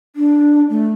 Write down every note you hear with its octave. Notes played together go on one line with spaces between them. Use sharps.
D4
A3